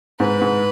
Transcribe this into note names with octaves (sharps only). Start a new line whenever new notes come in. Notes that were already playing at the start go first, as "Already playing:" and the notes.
G#2 B4
G#2